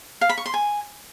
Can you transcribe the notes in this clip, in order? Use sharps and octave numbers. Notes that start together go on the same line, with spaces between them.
F5
B5
C#6
C6
G#5